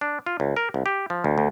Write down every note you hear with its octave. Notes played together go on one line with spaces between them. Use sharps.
D4
F4
C#2
A#4
C2
G4
F3
D2
D2